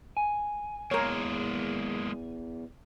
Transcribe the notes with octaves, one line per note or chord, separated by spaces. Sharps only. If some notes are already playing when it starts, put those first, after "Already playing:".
G#5
E2 G#3 A#3 A#4 C#5